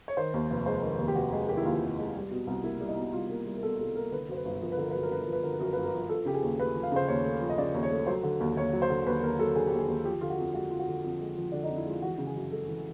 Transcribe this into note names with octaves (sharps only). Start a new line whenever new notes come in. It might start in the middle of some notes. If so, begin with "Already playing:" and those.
C#5
D#3 C5
D#2
F1
G#3 C5
D#3
D#2
G4
F1 F#4
G#3 G#4
D#3 G4
E4
D#2 F4
F1
G#3
G3
B2
C2
A#3 E4
G3
D#4
B2
C2 F4
A#3
G3
A#4
B2 A4
C2 A4
A#3 A#4
D3 B4
F#2 C5
B4
G1
F3 A#4
B4
D3 A#4
F#2 B4
A#4
G1 B4
A#4
F3
B4
D3 A#4
B4
F#2 A#4
G1 B4
A#4
F3
F3 A4
C#3 G4
G#4
D#2
A3 B4
F3
F5
C#3 C5
D#2 C#5
A3
F3
D#5
C#3 D5
D#2
C#5
A3
F#3 C5
D3
D#2
D#2 C#5
F#3
C5
D3
D#2 B4
D#2 A#4
F#3 A4
D3 G#4
D#2 G4
G#4
D#2
F3 G4
D3 F4
F#4
F2
G#3 F#4
F3 F4
F#4
D3
F2
G#3
F3
D3 D4
D#4
F2
E4
G#3 F4
E3 F#4
C#3
G#4
F#2
G#3 A4
E3